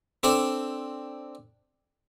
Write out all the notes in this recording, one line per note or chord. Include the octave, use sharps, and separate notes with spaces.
C4 D4 A4 D5